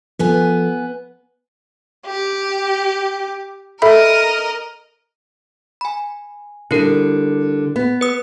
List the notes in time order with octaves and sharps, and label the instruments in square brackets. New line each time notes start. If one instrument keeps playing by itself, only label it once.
[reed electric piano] F3 A4 [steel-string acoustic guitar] B3 B4 G#5
[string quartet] G4
[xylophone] A4 E5 B5 [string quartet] A#4 D#5
[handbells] G#5 B5
[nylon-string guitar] D3 G3 [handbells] E4 A#4
[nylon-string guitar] B3
[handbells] B4 D#6